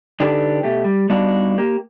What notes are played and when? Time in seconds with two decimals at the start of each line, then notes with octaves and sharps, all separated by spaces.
0.20 D3 D4 D#4 G4 A4 B4
0.63 B2 A3 G4
0.84 G3
1.10 G3 B3 D4 D#4 F#4 F5
1.58 A#3 G4